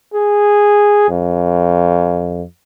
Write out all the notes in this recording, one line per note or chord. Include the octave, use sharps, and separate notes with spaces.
G#4
F2